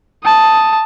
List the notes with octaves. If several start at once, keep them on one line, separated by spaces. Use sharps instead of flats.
A5 D#6